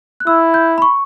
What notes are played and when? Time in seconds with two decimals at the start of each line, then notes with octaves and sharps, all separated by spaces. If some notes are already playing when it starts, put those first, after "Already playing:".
0.20 F#6
0.27 E4 E6
0.54 G6
0.78 B5
0.82 C#6